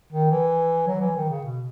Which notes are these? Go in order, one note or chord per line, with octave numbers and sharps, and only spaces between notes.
D#3
E3
F#3
E3
D#3
C#3
B2